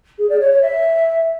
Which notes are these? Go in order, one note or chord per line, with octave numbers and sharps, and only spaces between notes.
G#4
D5
C#5
C#5
E5